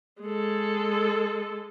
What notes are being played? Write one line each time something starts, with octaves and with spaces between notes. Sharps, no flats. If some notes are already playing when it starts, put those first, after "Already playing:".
G#3 A4